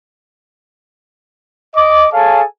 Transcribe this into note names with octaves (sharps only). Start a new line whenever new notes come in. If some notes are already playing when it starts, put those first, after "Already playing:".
D#5 D6
G#4 A4 C#5 F5 G#5 A5